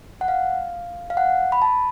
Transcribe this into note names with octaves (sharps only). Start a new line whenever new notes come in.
F#5
F5
F5
F#5
B5
A5